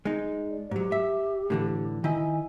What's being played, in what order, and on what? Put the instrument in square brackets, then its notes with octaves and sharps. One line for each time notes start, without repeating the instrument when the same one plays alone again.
[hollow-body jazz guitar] G#3 D#4
[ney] D5
[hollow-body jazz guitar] G#2 F#3 [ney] G4
[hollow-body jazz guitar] E5
A2 D3 E3
[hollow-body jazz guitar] D#3 E4 D#5 [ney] G#5